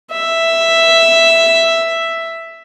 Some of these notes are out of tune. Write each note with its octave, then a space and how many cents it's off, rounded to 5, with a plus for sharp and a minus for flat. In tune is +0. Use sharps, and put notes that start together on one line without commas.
E5 +5